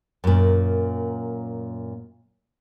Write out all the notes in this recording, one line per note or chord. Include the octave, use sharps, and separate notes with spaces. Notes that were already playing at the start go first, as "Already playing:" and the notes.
F#2 A#2